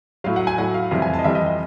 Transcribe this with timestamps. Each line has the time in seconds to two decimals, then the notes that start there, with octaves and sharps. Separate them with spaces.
0.24 A2 F#3 F5
0.36 F#5
0.47 G#5
0.58 A2 F#3 F#5
0.74 F5
0.91 F2 C3 E3 G3
1.02 G#5
1.14 A5
1.19 D#5
1.24 F2 C3 E3 G3 E5
1.35 D#5
1.46 D#5